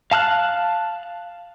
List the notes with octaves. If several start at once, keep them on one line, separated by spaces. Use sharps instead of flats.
F5 A5 F6 F#6